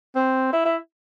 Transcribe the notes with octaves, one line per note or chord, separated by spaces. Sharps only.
C4
E4
E4